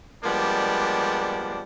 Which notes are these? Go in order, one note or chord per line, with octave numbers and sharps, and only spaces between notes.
F3 G3 G#3 A#3 B3 D4